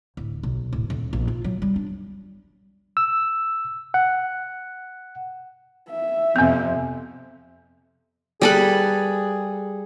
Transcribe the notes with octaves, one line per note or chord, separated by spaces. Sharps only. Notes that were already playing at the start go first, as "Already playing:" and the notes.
D1
B1
D1
D#1
A#1
F4
F#3
G3
D4
E6
F#5
E5
F2 C3 B3 C4
G3 G#4 A4 B4